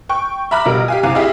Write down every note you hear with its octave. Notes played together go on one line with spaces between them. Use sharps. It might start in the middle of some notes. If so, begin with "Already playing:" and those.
G5 C#6
E5 A#5 B5 D6 F6
B2 G3 A#4
G4 F5 G#5
C2 C4 F5 G#5 A#5 D6
E4 G4 G#4 D#5 F5